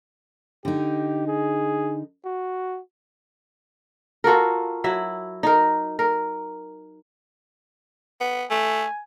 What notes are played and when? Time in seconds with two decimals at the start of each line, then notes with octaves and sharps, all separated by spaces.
0.65 D3 D#4 G4
1.28 G#4
2.25 F#4
4.24 F4 F#4 A4 A#4
4.84 F#3 E4 E5
5.43 D#4 A#4
5.99 A#4
8.20 B3
8.50 A3 G#5